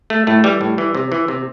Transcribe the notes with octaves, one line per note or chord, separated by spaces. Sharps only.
A3
A2 A3
E3 G3
A2
E3
C3
E3
C3